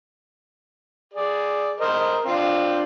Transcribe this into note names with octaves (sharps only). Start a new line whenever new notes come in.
G#4 D5
A#4 C5 D#5
C4 D4 F4